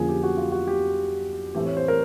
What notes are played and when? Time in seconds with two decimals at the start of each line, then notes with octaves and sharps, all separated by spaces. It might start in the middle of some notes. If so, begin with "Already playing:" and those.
Already playing: F2 D3 F3 A#3 C#4 G#4
0.09 G4
0.23 F#4
0.37 F4
0.52 F#4
0.67 G4
1.54 A2 E3 A3 C4 G4
1.66 C#5
1.77 C5
1.88 A#4